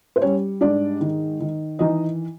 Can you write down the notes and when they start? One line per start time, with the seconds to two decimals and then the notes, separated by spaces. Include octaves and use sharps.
0.16 C5
0.21 G3 C#4 C#5
0.61 G#2 D4 D5
1.01 D#3
1.40 D#3
1.79 E3 D#4 D#5